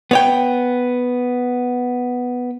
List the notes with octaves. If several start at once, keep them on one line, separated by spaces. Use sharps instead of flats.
B3 C#5 G5